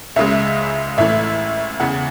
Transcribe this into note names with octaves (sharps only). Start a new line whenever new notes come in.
C#2 C#3 G#3 E5
A1 A2 E3 A3 E5
E2 C#3 E3 F#5